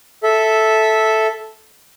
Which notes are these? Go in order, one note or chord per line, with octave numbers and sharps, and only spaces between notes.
A4 E5